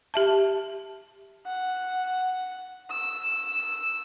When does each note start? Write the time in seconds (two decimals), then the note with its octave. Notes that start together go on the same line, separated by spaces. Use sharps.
0.14 G4 E5 A5
1.46 F#5
2.91 E6